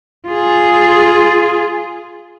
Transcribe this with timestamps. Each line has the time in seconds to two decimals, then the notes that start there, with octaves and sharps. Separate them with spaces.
0.28 F4 G#4